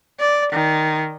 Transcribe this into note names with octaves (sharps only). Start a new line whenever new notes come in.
D5
D#3